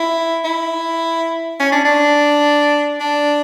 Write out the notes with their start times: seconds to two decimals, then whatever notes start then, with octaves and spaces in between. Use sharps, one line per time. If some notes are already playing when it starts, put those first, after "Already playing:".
Already playing: E4
0.44 E4
1.60 C#4
1.72 D4
1.85 D4
3.00 D4